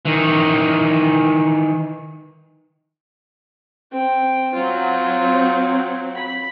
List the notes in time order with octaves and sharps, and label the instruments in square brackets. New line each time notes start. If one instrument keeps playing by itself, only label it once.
[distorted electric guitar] D#3 E3
[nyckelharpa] C4 G5
[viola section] F#3 C4 [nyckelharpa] F4 C5
[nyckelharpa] B5